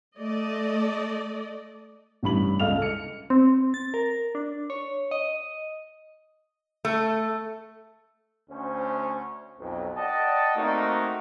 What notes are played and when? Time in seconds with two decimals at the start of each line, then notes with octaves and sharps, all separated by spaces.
0.17 A3 D5 D#5
2.23 A1 G2 B5 F#7
2.59 C#2 A4 D#5 F5 F6 F7
2.82 C#7
3.30 C4
3.74 A6
3.94 A#4
4.35 D4
4.70 C#5
5.11 D#5
6.85 A3
8.50 D2 C#4 C5
9.59 B1 F2
9.95 D5 D#5 F#5 G5 A5
10.56 A3 A#3 C4 D#4 F#4